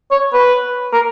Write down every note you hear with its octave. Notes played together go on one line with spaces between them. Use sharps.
C#5
B4
A#4